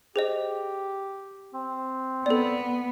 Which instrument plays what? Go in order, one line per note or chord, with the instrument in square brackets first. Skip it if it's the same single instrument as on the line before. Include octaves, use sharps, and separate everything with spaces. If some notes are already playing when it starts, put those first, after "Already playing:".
[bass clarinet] G4 [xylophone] G#4 C5 D#5
[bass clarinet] C4
[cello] B3 [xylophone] A4 D5